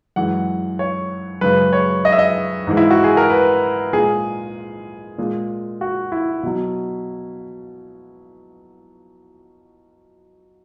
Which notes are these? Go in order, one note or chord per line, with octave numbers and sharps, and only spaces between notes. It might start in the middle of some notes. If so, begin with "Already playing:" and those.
F#2 E3 G#3 F#5
C#5
F#2 C#3 G#3 B4
C#5
D#5
E5
D#5
G#2 E3 G#3
E4
F#4
G#4
A#4
B4
A#2 G#3 G#4
A#2 G#3
F#4
E4
B2 F#3